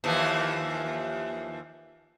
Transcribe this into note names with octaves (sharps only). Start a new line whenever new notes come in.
D#2 E3 F3